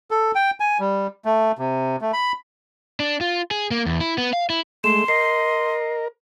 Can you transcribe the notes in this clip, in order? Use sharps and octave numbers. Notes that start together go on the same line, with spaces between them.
A4
G5
G#5
G3
A3
C3
A3
B5
D4
F4
G#4
A#3
E2
E4
B3
F5
E4
G#3 A3 C6 E7
A#4 D#5 C7